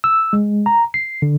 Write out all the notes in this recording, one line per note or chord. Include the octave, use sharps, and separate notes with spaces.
E6
G#3
A#5
C7
D3